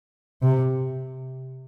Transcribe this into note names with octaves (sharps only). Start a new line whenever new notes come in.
C3